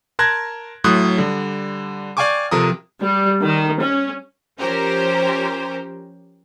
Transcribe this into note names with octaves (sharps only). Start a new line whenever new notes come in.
A#4 A5 C6 F#6 G#6 A#6
A2 F#3 C6 D#6 F#6
D3 G3
D5 F5 G5 G#5 C#6 D6
C3 F3 A4 A#4 D#6
G3
D#3
C#4
F3 C#4 G4 A#4 C5